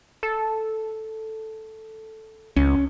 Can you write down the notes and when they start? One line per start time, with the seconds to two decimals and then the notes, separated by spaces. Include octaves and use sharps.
0.23 A4
2.57 C#2 C#4